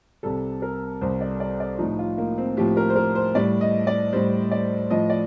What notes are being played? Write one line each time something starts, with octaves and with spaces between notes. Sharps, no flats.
C2 C3 G3 A4
A#4
C2 C3 G3 C5
D5
D5
D5
A2 F3 D#4
F4
A#3
C4
A2 F3 G4
A#4
C5
A#4
C5
A2 G3 D5
D#5
D5
A2 G3 C5
D5
A2 F3 D#5
D5